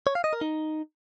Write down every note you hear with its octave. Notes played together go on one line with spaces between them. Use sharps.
C#5
F5
D#5
A#4
D#4